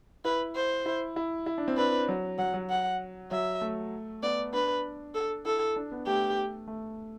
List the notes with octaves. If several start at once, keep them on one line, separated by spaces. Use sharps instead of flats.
E4 B4
C5
E4
E4
E4
D4
C4
D4 B4
F#3
F#3 F#5
F#3
F#5
F#3 E5
A3
B3 D5
D4 B4
A4
E4 A4
D4
B3
A3 G4
A3